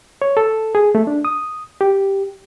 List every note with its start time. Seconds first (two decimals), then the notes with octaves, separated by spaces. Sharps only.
0.22 C#5
0.37 A4
0.75 G#4
0.95 A3
1.07 D4
1.25 D#6
1.81 G4